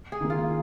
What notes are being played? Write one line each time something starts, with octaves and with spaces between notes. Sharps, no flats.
G#4
D#3 A#3
F4